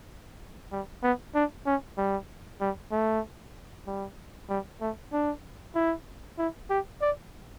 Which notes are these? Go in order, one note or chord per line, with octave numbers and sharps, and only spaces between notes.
G3
B3
D4
C#4
G3
G3
A3
G3
G3
A3
D4
E4
E4
G4
D5